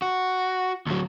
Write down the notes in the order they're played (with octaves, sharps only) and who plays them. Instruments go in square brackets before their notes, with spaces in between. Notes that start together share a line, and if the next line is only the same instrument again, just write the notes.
[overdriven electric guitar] F#4
D2 F#3